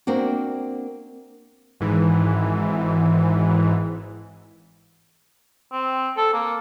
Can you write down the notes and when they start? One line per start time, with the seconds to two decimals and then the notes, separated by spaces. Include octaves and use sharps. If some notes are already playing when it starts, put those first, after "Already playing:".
0.07 A#3 C4 D4 F#4
1.80 G#1 G#2 E3
5.72 C4
6.17 A4
6.34 A#3